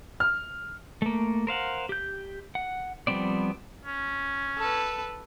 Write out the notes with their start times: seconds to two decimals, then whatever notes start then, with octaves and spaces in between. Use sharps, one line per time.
0.20 F6
1.02 A3 A#3
1.47 A#4 C5 F5 F#5
1.89 G4 G6
2.55 F#5
3.07 F3 G3 B3 C4 D5
3.85 C#4
4.58 A4 B4